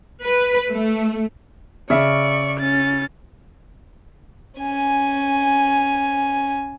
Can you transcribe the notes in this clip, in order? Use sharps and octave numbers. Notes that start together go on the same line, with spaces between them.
B4
A3
C#3 D5 E5 C#6
C#4 A6
C#4 G#5